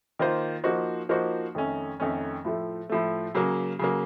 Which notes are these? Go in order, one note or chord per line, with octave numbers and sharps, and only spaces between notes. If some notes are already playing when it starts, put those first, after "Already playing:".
D#3 A#3 F4 C5
F3 A#3 D#4 F#4 C5
F3 A#3 D#4 F#4 C5
F2 D#3 A3 C#4
F2 D#3 A3 C#4
A2 F3 A3
A2 F3 A3
C#3 F#3 A#3
C#3 F#3 A#3